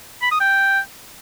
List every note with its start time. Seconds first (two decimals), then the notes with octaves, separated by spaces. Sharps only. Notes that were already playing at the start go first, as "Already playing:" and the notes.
0.22 B5
0.31 D#6
0.40 G5